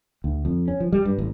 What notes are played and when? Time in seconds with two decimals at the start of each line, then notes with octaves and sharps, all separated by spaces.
0.24 D2
0.45 F2
0.68 C#4
0.80 F3
0.93 G3
1.05 G2
1.18 A1